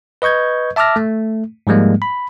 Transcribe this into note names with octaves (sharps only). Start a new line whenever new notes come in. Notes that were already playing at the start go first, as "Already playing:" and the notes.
B4 D#5 C#6 G6 G#6
E5 A5 D6 E6 F6 A#6
A3
G#2 F3 G3 G#3 A#3
B5